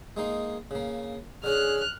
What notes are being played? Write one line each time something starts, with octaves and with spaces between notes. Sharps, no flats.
G#3 A#3 D#4
C#3 A#3
D3 C#4 G#4 F6 F#6